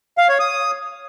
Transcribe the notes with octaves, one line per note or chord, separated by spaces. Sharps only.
F5
C#5
D#6